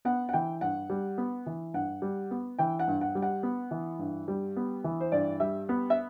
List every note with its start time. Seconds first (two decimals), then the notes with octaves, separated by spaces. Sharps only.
0.05 B3 F#5
0.29 F#5
0.33 E3 G5
0.61 G2 F#5
0.90 G3
1.18 B3
1.46 E3
1.74 G2 F#5
2.02 G3
2.31 B3
2.59 E3 G5
2.79 F#5
2.88 G2
3.01 F#5
3.15 G3
3.22 F#5
3.43 B3
3.71 E3
3.99 G2
4.28 G3
4.56 B3
4.84 E3
5.00 C5
5.12 G2 D5
5.40 G3 E5
5.69 B3
5.90 E5